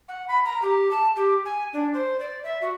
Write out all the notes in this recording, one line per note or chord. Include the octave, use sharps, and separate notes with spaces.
F#5
B5
A#5
G4
A5
G4
G#5
D4
C5
D5
E5
F#4